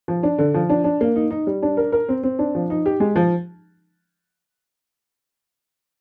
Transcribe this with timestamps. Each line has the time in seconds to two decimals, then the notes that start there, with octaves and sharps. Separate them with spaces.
0.08 F3
0.23 D4
0.38 D3
0.54 F3
0.70 D4
0.84 D4
1.01 A#3
1.16 D#4
1.30 D#4
1.47 G3
1.63 D4
1.77 A#4
1.92 A#4
2.09 C4
2.23 C4
2.39 D4
2.55 F3
2.70 D#4
2.86 G4
3.00 G#3
3.16 F3